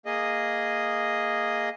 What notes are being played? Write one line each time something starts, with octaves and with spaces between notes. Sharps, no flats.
A#3 G#4 D#5